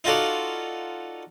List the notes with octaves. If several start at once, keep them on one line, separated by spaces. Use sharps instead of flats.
D#4 F4 F#4 A4 D5